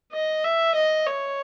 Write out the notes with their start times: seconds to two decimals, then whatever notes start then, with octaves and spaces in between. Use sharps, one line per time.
0.12 D#5
0.44 E5
0.75 D#5
1.07 C#5